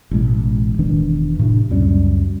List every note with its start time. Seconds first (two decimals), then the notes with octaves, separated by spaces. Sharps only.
0.11 A1 B2 G#3
0.79 E1 D#3 E3 D4
1.39 A2 C3 D4
1.70 C#2 F#2 G3 C#4